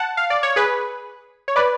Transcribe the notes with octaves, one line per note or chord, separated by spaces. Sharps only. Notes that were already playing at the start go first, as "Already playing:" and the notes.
Already playing: F#5 A5
F5
D5
C#5
G#4 B4
C#5
B4 D5